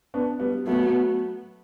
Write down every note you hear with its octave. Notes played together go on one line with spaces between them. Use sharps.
B3 D4
G3 B3
F#3 A3 B3